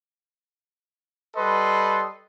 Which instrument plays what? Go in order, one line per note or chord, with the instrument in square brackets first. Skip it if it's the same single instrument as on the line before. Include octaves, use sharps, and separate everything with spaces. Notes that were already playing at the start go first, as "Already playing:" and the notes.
[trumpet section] G3 A4 B4 D#5 C6